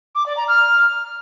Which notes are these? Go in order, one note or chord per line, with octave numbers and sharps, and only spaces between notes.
D6
D5
A#5
F6